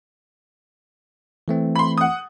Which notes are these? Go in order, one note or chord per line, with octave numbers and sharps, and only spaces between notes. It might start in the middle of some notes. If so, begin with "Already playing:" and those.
E3 A3 C4
B5 C6
F#5 D#6